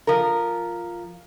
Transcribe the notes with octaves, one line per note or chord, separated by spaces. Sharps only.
F3 A#4